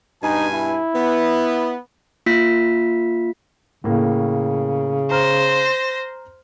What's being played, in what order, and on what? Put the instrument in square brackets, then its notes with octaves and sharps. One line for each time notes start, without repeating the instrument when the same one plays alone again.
[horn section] G2 B2 G#5 [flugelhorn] D#4
[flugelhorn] E4
[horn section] B3
[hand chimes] A#3 F4 B6
[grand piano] A2 A#3 [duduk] C#3
[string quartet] C5 A#6 [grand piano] A#5 F6